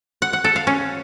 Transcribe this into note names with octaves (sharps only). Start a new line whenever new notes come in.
F#5
F#5
A4
F5
C#4